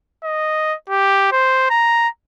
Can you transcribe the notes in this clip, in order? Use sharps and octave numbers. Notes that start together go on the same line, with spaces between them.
D#5
G4
C5
A#5